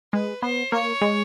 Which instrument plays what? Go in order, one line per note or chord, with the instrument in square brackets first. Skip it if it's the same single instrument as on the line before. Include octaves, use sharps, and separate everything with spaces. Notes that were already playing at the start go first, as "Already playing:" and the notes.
[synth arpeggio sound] G#3 [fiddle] B4
[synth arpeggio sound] B3 [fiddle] C5
[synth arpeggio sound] A#3 [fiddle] C#5
[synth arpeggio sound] G#3